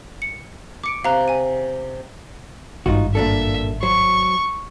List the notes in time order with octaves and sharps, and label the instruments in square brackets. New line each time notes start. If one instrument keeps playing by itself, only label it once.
[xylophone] C#7
[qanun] C#6 [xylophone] D6 C#7 D7
[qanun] C3 [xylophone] F5 A#5 F#6
[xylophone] G#5 D#7
[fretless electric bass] G#1 G2 [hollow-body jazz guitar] D#4 F4 F#4
[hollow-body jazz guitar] A#2 D4 A4 [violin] E5
[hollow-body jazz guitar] F#3 C5 [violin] C#6